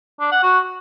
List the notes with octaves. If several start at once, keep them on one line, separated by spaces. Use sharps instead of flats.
D4
F#5
F#4